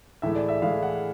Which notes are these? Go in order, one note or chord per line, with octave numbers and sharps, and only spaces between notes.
A2 E3 G#3 E5
D5
E5
A2 E3 G#3 F5
F#5